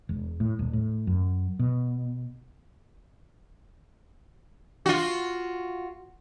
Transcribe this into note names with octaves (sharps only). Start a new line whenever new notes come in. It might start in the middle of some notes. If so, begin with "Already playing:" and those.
E1
A2
D#1
A2
F#2
B2
F4 F#4